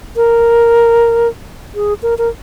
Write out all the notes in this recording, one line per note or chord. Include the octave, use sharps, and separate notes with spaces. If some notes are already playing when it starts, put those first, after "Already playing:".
A#4
G#4
A#4
A#4